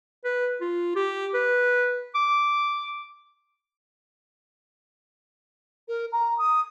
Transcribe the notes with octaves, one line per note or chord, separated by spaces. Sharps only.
B4
F4
G4
B4
D6
A#4
A#5
D#6